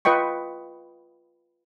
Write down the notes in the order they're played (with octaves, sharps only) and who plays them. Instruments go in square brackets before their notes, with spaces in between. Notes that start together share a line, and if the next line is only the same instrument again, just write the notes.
[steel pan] F4 B4 D#5 G5 C#6